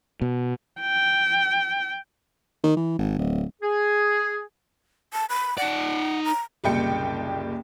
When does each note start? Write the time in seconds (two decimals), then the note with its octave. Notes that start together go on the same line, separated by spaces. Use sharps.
0.22 B2
0.80 G5
2.63 D#3
2.77 E3
2.99 G#1
3.19 D1
3.62 G#4
5.13 A5
5.30 B5
5.58 D#4 D5 F#5
6.25 A#5
6.64 F#1 C2 A#2 G5 C#7